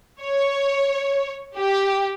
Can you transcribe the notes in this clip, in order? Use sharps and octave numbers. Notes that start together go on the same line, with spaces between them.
C#5
G4